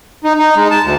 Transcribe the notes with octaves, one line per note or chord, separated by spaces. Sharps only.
D#4
D#4
G#3
A5
D2